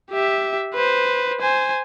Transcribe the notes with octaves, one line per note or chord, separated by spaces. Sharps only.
G4 E5
B4 C5
C5 G#5